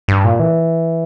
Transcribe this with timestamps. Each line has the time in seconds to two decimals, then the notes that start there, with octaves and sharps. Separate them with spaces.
0.08 G2
0.24 A#2
0.39 E3